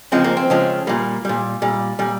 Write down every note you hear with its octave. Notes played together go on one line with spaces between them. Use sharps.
C#3 F3 G#3 C4
A#3
C4
C#3 F3 G#3
A#2 G3 A#3
A#2 G3
A#2 G3
A#2 G3